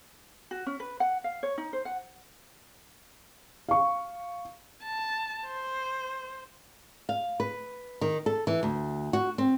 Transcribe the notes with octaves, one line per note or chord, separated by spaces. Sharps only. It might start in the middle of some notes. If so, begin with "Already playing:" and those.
F#4
C#4
B4
F#5
F5
C#5
D#4
C5
F#5
F5 C#6
A5
C5
F5
B4
D#3
A4
E3
D2
F#4
C4